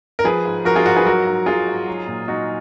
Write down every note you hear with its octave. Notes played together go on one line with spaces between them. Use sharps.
A#4
F3 G#4 B4
G#2
F3 F#4 A#4
F4 G#4
G#2 F#4 A#4
G#4 B4
F#3 F#4 A#4
G#2
F#3 F4 G#4
G#2
F#3
A#2
F#3 D#4 F#4